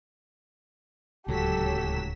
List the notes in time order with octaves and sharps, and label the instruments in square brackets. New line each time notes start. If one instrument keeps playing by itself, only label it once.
[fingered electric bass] D1 [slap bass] C#2 A#2 [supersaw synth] F#3 B6 E7 [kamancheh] G4 A4